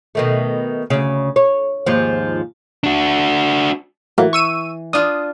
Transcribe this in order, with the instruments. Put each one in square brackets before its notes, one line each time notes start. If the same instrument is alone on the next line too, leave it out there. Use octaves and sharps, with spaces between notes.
[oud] B2 D#3 A3
D2 C#3
C#5
D#2 G#2 F3
[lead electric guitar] D4 F#4
[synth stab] A2 F#3 A#3 [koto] E3
[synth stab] C#6 E6 D#7
[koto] D4 F4 [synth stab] D#6